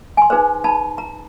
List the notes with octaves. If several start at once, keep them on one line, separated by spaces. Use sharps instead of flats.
G#5 C6
D#4 G#4 B4 C5
D#4 A5 B5
A#5